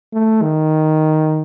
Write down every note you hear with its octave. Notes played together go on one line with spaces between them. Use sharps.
A3
D#3